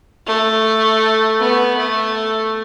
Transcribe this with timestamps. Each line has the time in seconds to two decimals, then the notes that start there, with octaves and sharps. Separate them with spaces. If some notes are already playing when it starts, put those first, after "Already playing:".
0.27 A3
1.40 B3
1.78 A3